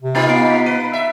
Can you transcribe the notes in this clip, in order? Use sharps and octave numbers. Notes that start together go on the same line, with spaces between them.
C3
A#3 D#4 F4 A#5 B5 A6
B3 C7 D7
B5 B6
B4 D#7
E5